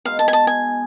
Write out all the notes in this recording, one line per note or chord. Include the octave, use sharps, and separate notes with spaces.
B2 G#3 B3 D#4 F5
A5
G#5
A5
G#5